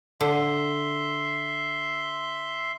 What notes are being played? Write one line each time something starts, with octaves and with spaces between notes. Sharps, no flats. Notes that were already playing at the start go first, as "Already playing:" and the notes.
D3 E5 C6